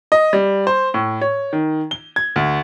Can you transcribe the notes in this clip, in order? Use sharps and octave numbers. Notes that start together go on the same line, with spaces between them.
D#5
G3
C5
A2
C#5
D#3
G7
G#6
D2